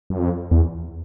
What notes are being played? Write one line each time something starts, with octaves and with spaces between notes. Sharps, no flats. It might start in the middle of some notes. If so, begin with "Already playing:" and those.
F#2
F2
E2